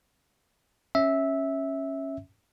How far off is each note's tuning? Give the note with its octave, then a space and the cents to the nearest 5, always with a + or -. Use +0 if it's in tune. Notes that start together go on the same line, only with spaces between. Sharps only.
C#4 -10 E5 -10